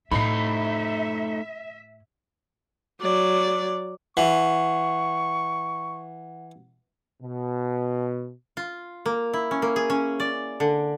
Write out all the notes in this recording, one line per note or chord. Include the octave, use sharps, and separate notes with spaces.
A2 A3 D#4 E4 E5 B5 C7
F#3 D5
E3 F#5 C#6
B2
F4
A#3
E4
C#4
A#3
G#4
C#4
D5
D3